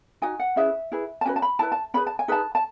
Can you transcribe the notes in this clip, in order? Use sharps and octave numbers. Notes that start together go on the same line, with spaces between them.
D#4 F#4 G#5
F#5
C#4 E4 G#4 B4 E5
E4 G#4 B4
A5
C#4 F#4 B4 G#5
A5
B5
E4 G#4 B4 A5
A5
C#4 G#4 B4 B5
A5
G#5
D#4 G#4 B4 A5
A5